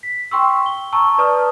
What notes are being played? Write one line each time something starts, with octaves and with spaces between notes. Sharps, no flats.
B6
G5 C6 C#6 E6
G7
A5 A#5 C#6 E6
B4 D5 A5 D#6 F6